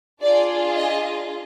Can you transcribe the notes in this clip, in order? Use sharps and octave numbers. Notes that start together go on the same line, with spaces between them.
D4 F4 G#4 D5
D#5